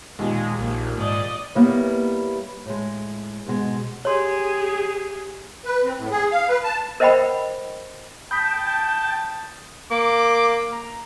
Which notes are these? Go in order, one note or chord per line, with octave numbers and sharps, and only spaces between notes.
D#2 A#2 G#3
A#1 A#3
G#2 D5 D#5
G3 A#3 B3 E4 B4 C#5
A2 G#3
G#2 B2 G#3
G4 G#4 C#5 C6
B4
C4
A2
G#4
F5
B4
A5
A#4 C5 D#5 F#5 G5 B5
G5 A5 B5 D#6 G6 B6
A#3 D6
A#5